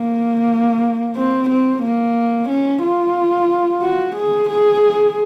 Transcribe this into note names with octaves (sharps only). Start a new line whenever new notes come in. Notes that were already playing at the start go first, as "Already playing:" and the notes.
Already playing: A#3
C4
C4
A#3
C#4
F4
F#4
G#4
G#4